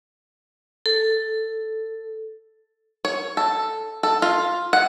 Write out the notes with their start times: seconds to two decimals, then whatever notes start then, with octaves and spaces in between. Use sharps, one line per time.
0.86 A4
3.05 C#5
3.37 A4
4.03 A4
4.22 F4
4.73 F#5